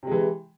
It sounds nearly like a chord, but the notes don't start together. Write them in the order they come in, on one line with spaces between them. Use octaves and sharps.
C3 G#3 E3